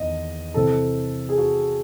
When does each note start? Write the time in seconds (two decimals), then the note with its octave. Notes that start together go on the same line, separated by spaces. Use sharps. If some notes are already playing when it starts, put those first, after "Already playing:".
Already playing: E2 D#3 D#5
0.54 C3 E3 C4 A4
1.29 G#4
1.38 F#4